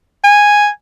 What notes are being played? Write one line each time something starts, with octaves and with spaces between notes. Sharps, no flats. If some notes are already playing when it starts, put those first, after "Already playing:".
G#5